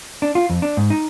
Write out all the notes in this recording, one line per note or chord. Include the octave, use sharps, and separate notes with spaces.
D4
F4
F2
D4
G#2
D#4